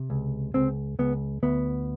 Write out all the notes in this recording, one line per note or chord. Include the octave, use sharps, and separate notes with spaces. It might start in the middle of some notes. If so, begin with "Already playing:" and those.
Already playing: C3
C#2
C#2 C4
C#2 B3
D2 B3